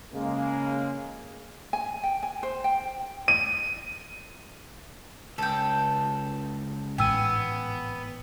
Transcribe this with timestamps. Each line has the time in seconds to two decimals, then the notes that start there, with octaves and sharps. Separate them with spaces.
0.14 C#3 G#3 A#3
1.73 G#5
2.03 G5
2.23 G#5
2.43 C5
2.64 G5
3.28 D#7
5.38 C#2 A4 G5
6.98 A1 G#2 B3 G5 G#5 E6 D#7